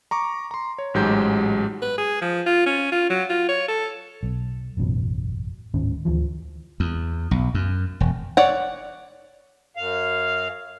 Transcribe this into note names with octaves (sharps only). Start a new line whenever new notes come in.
A#5 C#6 D6
A#5 C6
C#5
A1 G#2 F#3 G#3 G4 G6
B4
G#4
F3
F4
C#4
F4
F#3
F4
C#5
A4
B1
E1 A1 F#2 B2
D1 G#2 D#3 C#4
D2 E3 F3
E2
B1
F#2
E1
C#5 D5 F#5
F#2 F5